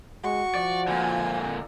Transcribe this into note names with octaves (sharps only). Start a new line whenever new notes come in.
G#3 F#4 C#6
F3 D5
A#2 D3 G#5